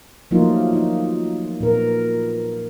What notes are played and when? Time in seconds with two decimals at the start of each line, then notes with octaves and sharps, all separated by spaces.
0.31 F3 F#3 A3 A#3 D#4 F4
0.73 D#4
1.60 A#2 B3 A#4